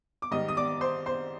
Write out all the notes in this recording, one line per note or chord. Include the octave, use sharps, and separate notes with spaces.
D6
G#2 D#3 G3 D#5 D#6
D#6
D5 D6
C5 C6
C5 C6